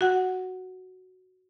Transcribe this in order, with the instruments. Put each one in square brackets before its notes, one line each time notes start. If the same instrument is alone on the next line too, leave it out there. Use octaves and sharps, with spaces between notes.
[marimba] F#4 F#5